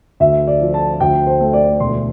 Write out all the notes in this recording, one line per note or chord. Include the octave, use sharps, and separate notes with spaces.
D2 E5
D5
F3
A5
D2 G5
C5
A3
D5
E1 C6